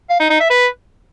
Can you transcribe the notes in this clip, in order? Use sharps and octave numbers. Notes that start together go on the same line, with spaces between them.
F5
D#4
D#4
E5
B4